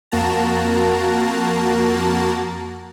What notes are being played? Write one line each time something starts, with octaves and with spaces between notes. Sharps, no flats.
F2 A#3 F#4 A5 A#5